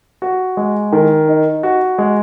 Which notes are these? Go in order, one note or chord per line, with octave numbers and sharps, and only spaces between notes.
F#4
G#3
D#3
D#4
F#4
G#3